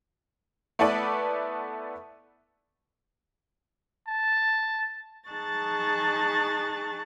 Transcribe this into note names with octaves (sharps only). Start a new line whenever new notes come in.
A3 B3 E4 A4 B4 D5
A5
D#4 G#4 A5 C#6 F#6 A6